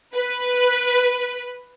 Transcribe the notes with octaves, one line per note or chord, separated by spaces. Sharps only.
B4